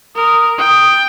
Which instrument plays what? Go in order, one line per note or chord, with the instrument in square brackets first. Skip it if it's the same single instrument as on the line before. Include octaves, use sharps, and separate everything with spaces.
[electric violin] A#4 [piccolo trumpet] D#6
[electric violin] G5 [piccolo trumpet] D#6